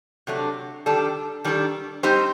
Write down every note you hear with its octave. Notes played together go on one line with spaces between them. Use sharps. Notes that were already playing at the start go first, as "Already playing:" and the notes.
C3 F#3 A3 D4
D#3 G3 D4 A4
D#3 G3 D4 A4
G3 C4 D#4 G4 C5